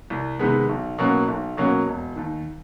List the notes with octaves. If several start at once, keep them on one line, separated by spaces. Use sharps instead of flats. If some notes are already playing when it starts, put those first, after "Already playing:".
C2
C3 D#3 G#3 B3
B1
B2 F#3 A#3 C#4
B1
B2 F#3 A#3 C#4
E1
D#2 D#3